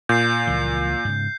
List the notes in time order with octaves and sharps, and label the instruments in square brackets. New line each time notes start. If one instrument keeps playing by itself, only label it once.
[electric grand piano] A#2 [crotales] G6 C7
[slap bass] C#2 E3 F3
G#2 C#3